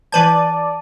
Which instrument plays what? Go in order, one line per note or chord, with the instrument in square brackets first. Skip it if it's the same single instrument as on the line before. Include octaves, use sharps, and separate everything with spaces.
[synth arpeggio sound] E3 B4 G6 [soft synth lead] D5 [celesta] A5 D#7